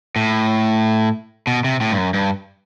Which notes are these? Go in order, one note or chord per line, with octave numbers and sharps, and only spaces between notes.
A2
B2
C3
A2
G2
F#2
G2